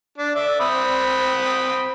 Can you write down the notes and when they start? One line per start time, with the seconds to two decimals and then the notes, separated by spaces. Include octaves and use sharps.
0.18 D4
0.36 D5 E5
0.60 C4 B5 D#6